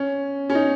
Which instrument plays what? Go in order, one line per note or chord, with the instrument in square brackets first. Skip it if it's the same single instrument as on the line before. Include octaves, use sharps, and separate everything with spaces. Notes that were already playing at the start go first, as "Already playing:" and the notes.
Already playing: [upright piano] C#4
C#4
D#4